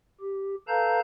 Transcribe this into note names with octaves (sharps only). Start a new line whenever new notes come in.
G4
A4 B4 F5 A5 A#5 G6